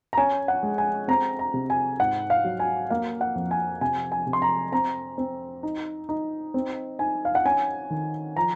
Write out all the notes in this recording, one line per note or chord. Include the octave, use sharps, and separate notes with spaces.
A#5
C#4 G#5
F#5
G#3
G#5
C4 A#5
A#5
C3
G#5
G#2 F#5
F5
F#3
G#5
A#3 F5
F#5
F2
G#5
C3 G#5
G#5
C3
C6
A#5
C4 A#5
C4
D#4
D#4
C4
D#4 G#5
F5
F#5
C#4 G#5
D#3
F3 A#5